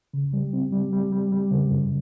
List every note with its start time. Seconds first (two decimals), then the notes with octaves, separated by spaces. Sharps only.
0.14 C#3
0.33 G3
0.53 C4
0.72 G3
0.93 G3
1.12 G3
1.32 G3
1.51 C#3
1.71 F#2